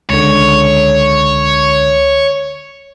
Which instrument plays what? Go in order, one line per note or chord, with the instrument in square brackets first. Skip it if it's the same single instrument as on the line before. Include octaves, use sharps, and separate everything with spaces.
[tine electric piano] C#2 D3 [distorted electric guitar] C#5